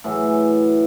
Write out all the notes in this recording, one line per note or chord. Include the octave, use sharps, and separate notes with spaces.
A2 E3 F#3 G#4